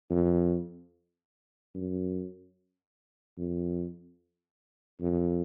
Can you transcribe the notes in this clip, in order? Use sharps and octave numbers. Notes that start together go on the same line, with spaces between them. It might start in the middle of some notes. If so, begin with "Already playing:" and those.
F2
F#2
F2
F2